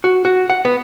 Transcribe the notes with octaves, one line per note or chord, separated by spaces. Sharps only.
F#4
F#4
F#5
B3